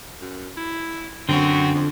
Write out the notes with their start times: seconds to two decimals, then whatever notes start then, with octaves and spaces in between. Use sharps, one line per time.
0.21 F#2
0.57 E4
1.29 F#2 D3 C4 F#4
1.75 F2